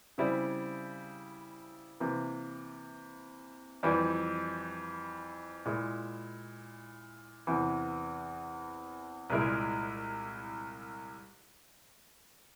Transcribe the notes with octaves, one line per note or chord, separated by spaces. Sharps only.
C#3 G3 C4 E4
C3 E3 A#3
F2 E3 G3
A#2 G#3 E4
E2 C3 E3
C2 A#2 G#3 E4 A#4